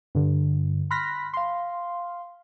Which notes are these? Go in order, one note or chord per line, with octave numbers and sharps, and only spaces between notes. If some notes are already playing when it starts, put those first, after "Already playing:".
G2 D3
B5 C6 F6 F#6 A#6 B6
F5 C6